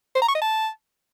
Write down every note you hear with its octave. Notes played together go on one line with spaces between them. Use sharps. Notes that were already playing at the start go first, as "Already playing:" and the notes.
C5
A#5
C#6
D#5
A5